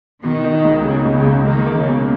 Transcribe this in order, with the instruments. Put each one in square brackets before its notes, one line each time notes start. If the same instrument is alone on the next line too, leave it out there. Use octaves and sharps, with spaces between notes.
[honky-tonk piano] B2 [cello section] D#3
[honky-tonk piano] D#4
C#2
[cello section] C#3 [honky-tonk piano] G#3
[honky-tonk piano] C#2
[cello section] C#3
[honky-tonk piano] C#2
[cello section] D#3 [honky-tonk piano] A#3
[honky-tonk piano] A#3
[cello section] C#3
[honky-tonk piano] B2